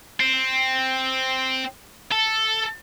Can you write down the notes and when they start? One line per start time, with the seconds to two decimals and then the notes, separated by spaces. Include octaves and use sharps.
0.20 C4
2.12 A4